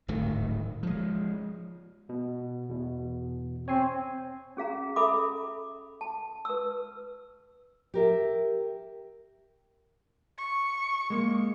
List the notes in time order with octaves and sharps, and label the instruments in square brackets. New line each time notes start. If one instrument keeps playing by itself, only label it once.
[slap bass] D1 G#1 D#3 A3
F3 G#3
[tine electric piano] B2
E2 B2
[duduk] C4 [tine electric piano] C#5 G#5 C7
[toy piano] C#4 G#4 F5 A#5
A4 E5 A#5 B5 D6
A5
B4 E6
[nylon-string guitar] G4 A#4 E5
[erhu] C#6
[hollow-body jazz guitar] G#3 A#3